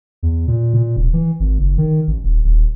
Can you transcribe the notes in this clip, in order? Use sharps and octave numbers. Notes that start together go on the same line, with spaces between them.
E2
A#2
A#2
D1
E3
G#1
F#1
D#3
A1
D#1
D#1